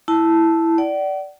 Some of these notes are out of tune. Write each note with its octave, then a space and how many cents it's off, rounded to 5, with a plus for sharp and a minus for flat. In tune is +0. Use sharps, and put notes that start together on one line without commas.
E4 +0 A5 +0
D5 -5 F#5 +40